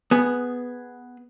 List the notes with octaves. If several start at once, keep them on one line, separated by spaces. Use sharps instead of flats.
B3 G#4